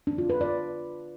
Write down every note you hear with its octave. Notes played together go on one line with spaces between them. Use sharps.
D4
F4
B4
D5